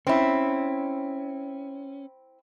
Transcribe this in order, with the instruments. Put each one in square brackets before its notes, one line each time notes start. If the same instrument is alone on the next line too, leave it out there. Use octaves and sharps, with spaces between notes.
[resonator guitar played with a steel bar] C4 E4 [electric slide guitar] C#4